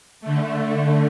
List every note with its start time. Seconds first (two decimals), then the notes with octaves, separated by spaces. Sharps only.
0.21 D3 A3